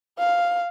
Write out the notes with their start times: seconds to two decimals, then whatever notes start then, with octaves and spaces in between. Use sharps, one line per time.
0.19 F5